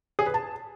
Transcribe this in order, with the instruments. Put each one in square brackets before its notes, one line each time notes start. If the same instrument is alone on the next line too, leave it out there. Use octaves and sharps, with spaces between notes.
[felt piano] G#4
B4
A5